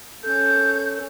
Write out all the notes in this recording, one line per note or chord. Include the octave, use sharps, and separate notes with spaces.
C#4 A4 G6